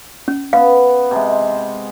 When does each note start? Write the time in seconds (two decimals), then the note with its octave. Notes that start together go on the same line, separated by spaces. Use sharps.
0.28 C#4
0.53 B3 F5
1.11 C3 G#3